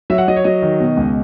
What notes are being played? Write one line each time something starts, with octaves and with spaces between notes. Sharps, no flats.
F#3 E5
F#5
F#3 D#5
C#5
F#3 D#5
D#3
B2
C#2